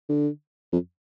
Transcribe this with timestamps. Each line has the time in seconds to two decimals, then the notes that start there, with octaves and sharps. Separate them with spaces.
0.09 D3
0.72 F2